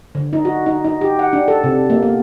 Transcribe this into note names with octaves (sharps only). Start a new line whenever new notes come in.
D3
D#4
F#4
D#4
D#4
G4
F#5
D4
A4
C3
A#3
B3